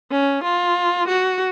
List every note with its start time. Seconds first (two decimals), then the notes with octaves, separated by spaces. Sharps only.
0.11 C#4
0.44 F4
1.08 F#4